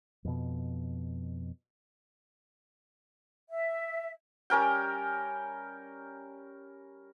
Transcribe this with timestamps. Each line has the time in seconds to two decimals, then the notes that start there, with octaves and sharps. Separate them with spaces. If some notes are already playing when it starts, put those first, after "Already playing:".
0.25 F2 B2
3.50 E5
4.50 G3 C#4 A#4 G5